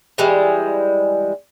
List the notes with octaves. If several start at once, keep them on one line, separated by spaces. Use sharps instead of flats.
E3 G3 G#3